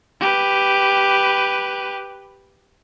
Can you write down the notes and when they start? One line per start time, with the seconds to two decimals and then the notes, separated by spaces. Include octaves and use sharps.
0.20 G4 B4